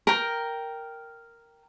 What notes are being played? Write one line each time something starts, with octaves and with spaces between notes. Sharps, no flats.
A#4 G5